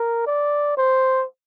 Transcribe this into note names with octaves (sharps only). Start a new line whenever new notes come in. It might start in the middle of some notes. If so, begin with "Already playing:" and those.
Already playing: A#4
D5
C5